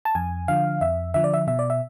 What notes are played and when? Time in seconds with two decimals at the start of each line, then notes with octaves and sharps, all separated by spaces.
0.05 A5
0.15 F2 G#5
0.48 D3 F3 F5
0.81 F2 E5
1.14 D3 F3 E5
1.24 D5
1.34 E5
1.47 B2 E5
1.59 D5
1.70 E5